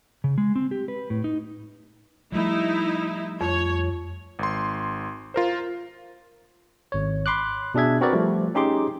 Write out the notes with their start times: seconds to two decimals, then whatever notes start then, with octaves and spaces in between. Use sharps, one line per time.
0.24 C#3
0.38 G#3
0.56 C4
0.71 G4
0.88 B4
1.10 A2
1.24 D#4
2.32 F3 G3 A3 D#4 E4
3.41 F2 C#5
4.39 G#1 C6
5.34 F4 A#4 C5
6.92 G#1 C#5
7.26 B5 C6 D6 F#6
7.75 B2 D4 G#4 E5 G#6
8.01 C4 F#4 A#4 B4 D5
8.13 F3 G3 A3
8.55 C#4 D#4 G4 G#4 C6 D6